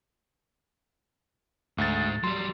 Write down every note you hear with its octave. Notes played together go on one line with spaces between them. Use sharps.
D2 G#2 A6
F#3 G3 C6